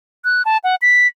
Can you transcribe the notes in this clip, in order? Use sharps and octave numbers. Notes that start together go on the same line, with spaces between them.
F#6
A5
F#5
B6